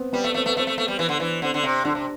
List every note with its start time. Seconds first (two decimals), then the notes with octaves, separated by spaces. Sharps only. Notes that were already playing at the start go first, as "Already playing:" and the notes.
Already playing: B3 C4
0.13 G3 B3
0.24 A3
0.34 A3 C4
0.46 A3 B3
0.57 A3 C4
0.67 A3
0.78 A3 B3
0.88 G3
0.99 E3
1.09 D3
1.20 E3
1.42 D3 C4
1.54 D3
1.63 C3
1.85 D3 D4
1.95 C3